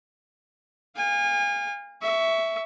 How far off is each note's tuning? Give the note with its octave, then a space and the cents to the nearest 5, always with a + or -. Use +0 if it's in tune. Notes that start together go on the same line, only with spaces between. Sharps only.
F5 +10 G#5 -35
E5 +0 C#6 +20